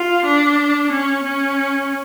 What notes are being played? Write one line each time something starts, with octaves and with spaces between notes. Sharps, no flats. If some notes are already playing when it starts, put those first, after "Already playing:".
Already playing: F4
D4
C#4
C#4